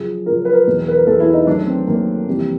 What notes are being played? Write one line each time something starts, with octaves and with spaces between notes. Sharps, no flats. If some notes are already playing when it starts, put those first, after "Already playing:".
Already playing: F#2 C#3 F3 G#4
F#2 C#3 F3 A#4
B4
A#4
E2 B2 F#3
B4
A#4
E2 B2 F#3 A4
E4
D#4
F#2 D#3 F#3 A3 D4
C4
F#2 D#3 F#3 A3 A#3
F2 C3 E3 G3